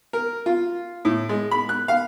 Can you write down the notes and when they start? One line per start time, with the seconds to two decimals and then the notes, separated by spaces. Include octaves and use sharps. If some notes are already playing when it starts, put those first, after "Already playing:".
0.13 A#4
0.46 F4
1.05 A2
1.29 G#3
1.51 B5
1.69 F#6
1.88 F5